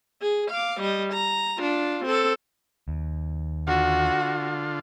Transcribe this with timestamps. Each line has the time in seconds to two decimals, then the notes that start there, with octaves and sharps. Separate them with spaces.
0.21 G#4
0.51 F5 D6
0.80 G3 D#5
1.13 A#5
1.58 D4 F4
2.05 C4 A4
2.88 D#2
3.67 D3 F4 F#4